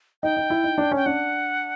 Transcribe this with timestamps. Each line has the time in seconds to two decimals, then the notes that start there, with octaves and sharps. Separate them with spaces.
0.23 D#4 G5
0.37 D#4
0.50 E4
0.64 D#4
0.78 D4
0.91 C#4 G5
1.06 D4 F#5